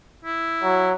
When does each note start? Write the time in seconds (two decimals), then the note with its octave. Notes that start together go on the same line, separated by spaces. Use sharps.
0.25 E4
0.63 F#3